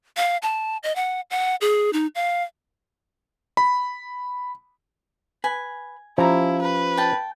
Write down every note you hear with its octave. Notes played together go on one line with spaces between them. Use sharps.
F5
A5
D#5
F#5
F#5
G#4
D#4
F5
B5
B4 G#5
F3 C#4 E4 G4 A#5
B4
G5 A5